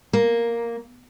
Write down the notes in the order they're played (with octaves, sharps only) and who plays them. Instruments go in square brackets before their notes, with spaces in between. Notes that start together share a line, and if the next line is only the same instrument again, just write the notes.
[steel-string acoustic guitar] A#3